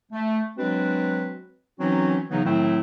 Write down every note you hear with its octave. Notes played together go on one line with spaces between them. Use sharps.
A3
F#3 G#3 C4 D4 F#4 B4
E3 F#3 C4 C#4 D#4 F#4
C#3 E3 F#3 B3 D#4
A2 D#3 F#3 A3 C4 E4